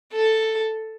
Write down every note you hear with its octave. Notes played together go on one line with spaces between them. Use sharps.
A4